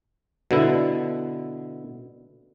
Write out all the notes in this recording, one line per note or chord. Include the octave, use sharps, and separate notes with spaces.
B2 D3 E4